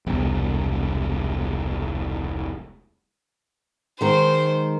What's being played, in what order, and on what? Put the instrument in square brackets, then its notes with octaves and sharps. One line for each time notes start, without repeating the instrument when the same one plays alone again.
[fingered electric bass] E1 C2
[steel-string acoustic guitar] D#3 G#3 [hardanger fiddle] C5